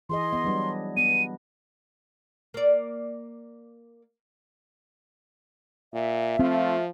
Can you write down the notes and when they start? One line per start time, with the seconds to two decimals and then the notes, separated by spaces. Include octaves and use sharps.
0.09 E3 G#4 D#5 C6
0.33 B3 D#5
0.44 F#3 G3 D4
0.97 B3 D#7
2.54 A#3 D5
5.94 A#2 E5
6.39 F3 A3 C4 F4